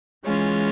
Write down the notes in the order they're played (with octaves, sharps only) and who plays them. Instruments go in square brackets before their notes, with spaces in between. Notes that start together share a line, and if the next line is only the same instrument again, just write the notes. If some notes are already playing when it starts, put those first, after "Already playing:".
[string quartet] E3 G#3 C#4 F4